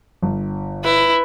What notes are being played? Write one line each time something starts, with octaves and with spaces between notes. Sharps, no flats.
G1
E4 B4